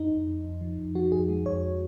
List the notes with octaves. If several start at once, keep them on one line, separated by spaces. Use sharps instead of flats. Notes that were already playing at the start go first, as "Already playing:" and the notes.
Already playing: F2 D#4
F2
F2
F2
F3
F2
F3 F#4
F2 G#4
G#3
F2 C#5